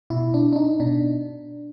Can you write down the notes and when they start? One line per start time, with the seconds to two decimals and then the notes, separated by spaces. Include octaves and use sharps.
0.10 B2 E4
0.34 D4
0.53 D4
0.56 D#4
0.80 B2 D4